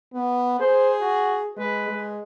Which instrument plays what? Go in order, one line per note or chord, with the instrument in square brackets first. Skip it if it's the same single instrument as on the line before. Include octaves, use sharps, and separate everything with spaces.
[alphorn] B3
[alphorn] G#4 [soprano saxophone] C5
[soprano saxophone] F#4
[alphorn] G#3 [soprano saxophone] B4
[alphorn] G#3